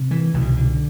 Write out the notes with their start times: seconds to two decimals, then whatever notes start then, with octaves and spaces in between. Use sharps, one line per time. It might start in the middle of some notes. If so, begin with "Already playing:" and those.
Already playing: C3
0.11 E3
0.34 C2 B2 E3
0.41 D3
0.57 D3